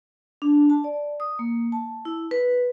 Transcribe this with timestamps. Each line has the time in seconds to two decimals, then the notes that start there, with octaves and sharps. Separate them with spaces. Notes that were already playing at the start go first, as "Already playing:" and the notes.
0.42 D4
0.70 A5
0.84 D5
1.20 D#6
1.39 A#3
1.72 A5
2.05 E4
2.31 B4